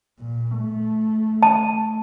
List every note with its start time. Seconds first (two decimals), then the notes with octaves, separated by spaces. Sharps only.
0.20 A#2
0.59 A3
1.43 A5